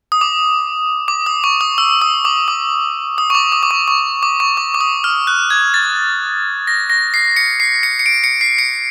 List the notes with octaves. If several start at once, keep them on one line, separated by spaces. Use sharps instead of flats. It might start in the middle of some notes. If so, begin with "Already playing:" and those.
D#6
D6
D6
D#6
C#6
D#6
E6
D#6
D6
D6
D#6
C#6
D6
D6
D6
C#6
C#6
D6
C#6
D6
D6
D#6
F6
F#6
G#6
A6
A#6
A#6
C7
C#7
C7
C#7
C#7
D7
C#7
C7
C#7